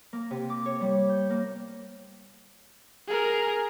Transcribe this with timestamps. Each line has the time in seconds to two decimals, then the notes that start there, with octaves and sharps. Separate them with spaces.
0.13 A#3
0.31 C3
0.50 D6
0.66 C#5
0.81 G3
1.09 G6
1.30 A#3
3.08 G#4 A#4